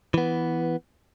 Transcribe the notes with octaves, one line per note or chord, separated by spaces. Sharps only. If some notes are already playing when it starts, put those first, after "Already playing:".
E3 B3